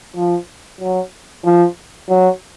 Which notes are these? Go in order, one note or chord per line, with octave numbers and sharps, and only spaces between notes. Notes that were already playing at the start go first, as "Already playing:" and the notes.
F3
F#3
F3
F#3